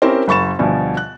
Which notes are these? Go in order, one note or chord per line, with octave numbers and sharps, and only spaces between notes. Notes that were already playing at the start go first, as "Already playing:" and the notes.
C4 C#4 E4 G4 A#4 C5
F#1 B5 C#6 A6 E7
D2 B2 F3 G3
F#6